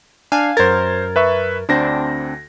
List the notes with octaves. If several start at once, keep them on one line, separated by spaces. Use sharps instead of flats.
D4 F5 G#5
F#2 A#4 C5 G#6 A6
B4 E5 C#6
D2 C4 D4 A#6